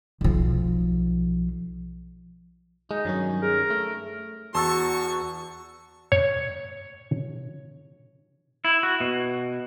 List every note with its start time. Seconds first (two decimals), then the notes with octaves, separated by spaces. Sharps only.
0.21 B1 F3
2.91 G#3 D#4
3.05 G2 D#3 F#3 C#4
3.43 G#4 A#4
3.70 A3
4.55 E2 F#4 A5 C#6 E6 A6
6.12 C#5
8.65 E4
8.83 F#4
9.00 B2